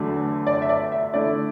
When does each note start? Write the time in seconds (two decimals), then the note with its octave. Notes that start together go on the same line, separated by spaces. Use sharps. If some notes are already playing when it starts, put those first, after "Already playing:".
Already playing: E2 D3 F#3 A3
0.47 D5
0.62 E5
0.69 D5
0.92 E5
1.14 D3 A3 E4 D5